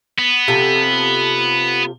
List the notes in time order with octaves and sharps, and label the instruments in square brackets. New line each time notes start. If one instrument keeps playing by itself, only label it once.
[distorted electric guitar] B3
[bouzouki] C3 F3 A4